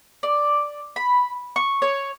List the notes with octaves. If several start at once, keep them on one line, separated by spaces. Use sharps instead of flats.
D5
B5
C#6
C#5